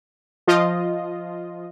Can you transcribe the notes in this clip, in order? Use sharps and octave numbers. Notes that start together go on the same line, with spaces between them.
F3 F4 D#5